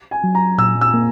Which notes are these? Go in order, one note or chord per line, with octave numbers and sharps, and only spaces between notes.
G#5
F#3
A#5
A#2 E6
E6
A#3